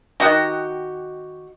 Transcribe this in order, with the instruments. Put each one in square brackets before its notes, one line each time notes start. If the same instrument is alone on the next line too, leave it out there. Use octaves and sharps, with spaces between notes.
[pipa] D#3 G4 [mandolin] F#4 D#6 F#6